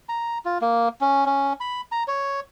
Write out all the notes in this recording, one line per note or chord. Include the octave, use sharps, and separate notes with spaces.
A#5
F4
A#3
C#4
C#4
B5
A#5
C#5